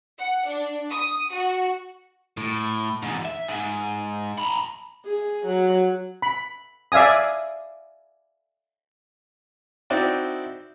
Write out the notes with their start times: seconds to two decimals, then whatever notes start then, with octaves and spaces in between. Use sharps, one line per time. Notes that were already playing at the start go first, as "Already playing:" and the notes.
0.20 F#5
0.48 D4
0.90 D#6
1.33 F#4
2.37 A2
3.02 E2 G#2
3.25 E5
3.49 G#2
4.38 A#5 B5
5.05 G#4
5.46 F#3
6.22 B5
6.92 D5 E5 F5 G#5 D#6
9.90 C4 D#4 E4 F#4 D5 G5